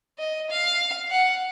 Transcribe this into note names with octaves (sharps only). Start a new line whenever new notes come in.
D#5
F5
F#5